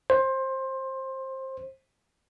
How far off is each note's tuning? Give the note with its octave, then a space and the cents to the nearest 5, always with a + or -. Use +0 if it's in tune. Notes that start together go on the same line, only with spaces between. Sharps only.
C5 +20